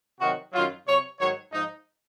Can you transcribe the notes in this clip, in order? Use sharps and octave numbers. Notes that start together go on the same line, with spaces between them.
C3 D#3 F#3 F#4
F#2 D#3 F#3 F4
C3 F#3 C#5
G#2 D#3 F#3 C#5
G#2 F3 D#4